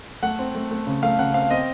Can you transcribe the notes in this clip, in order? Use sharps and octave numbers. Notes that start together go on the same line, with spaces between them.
A3 F#5
C4
A3
A3
C#3
A3 F5
C#3 F#5
C4 F5
C4 D#5